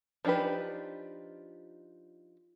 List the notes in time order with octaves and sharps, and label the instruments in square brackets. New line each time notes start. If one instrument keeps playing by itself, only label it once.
[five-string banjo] F3 D4 D#4 G4 B4